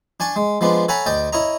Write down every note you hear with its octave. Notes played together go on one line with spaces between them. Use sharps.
D4 G#5 A5 C#6
G#3
F3 G#3 B3 D4
A4 C#5 F#5 G#5 A#5 B5
D2 D5 D#5 G5
E4 C#5 D#5 A#5